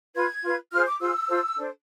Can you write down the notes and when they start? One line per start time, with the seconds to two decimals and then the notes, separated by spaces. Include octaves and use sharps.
0.15 F4 B4 G#6
0.43 F4 B4
0.71 F4 G#4 C5 F6
0.86 D6
0.99 F4 G#4 C5 E6
1.28 F4 A4 C5
1.56 D4 A4 C5